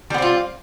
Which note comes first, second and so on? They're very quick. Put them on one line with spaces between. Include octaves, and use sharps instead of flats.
G3 B3 C4 F4